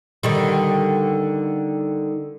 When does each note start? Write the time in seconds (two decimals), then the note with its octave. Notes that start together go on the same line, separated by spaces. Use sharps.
0.23 D3 D#3 G3